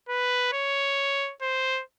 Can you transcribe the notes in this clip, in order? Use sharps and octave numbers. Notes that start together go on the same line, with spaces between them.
B4
C#5
C5